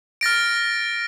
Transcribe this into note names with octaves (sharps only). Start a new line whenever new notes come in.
F6 A6 A#6 D7